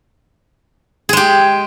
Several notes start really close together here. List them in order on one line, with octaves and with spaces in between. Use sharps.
G#4 G#3 G4